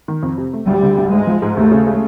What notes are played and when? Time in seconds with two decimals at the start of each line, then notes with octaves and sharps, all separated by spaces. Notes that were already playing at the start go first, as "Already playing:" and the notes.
0.08 D#3
0.23 F2
0.38 C3
0.53 A3
0.67 D2 G3
0.83 D3
0.98 D2
1.12 G#2 G#3
1.27 F3
1.42 G#2
1.57 D#2 A3
1.71 C#3
1.87 G#3